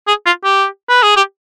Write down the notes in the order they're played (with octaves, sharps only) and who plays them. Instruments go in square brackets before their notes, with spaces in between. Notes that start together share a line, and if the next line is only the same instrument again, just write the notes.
[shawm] G#4
F4
G4
B4
G#4
G4